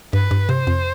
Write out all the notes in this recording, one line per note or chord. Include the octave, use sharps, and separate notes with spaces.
G2 B4
G2
C3 C5
F2